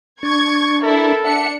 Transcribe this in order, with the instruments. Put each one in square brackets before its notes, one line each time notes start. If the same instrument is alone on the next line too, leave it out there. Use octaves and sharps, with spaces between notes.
[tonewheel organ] D4 [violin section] C#6 G#6
[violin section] E4 A#4 [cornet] A4
[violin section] D4 C#7 [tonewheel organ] E5 F#5